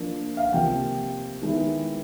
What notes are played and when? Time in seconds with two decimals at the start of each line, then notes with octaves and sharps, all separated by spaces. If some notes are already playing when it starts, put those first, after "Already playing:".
Already playing: F3 A#3 D4
0.37 F5
0.45 F#5
0.53 C3 F3 A#3 G5
1.42 D#3 G#3 B3 E4